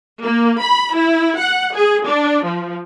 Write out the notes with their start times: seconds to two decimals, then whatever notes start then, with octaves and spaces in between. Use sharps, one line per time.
0.21 A#3
0.61 B5
0.95 E4
1.38 F#5
1.74 G#4
2.06 D4
2.44 F3